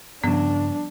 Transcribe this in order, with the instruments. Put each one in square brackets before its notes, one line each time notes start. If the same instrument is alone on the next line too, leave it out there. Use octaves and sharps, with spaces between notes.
[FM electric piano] G2 C#3 [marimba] F3 G3 B3 [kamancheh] D4